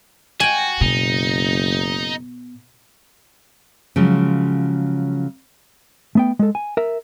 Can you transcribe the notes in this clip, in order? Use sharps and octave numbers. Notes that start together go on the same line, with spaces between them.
F#4 G5 G#5
F#1 B2 D#4
C#3 F3 F#3 G#3
A3 B3 G5
G#3 A4
G#5
A#4 E5